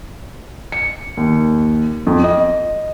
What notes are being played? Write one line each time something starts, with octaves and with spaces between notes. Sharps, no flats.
C#7
D#2
F2
D#5